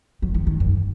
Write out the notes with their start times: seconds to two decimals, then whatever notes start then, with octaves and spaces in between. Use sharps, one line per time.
0.22 F#3
0.34 E3
0.47 D#3
0.60 F#2